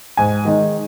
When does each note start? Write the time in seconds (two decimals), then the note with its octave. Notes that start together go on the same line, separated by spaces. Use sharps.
0.17 G#2 G#5
0.45 D#3 G#3 D#4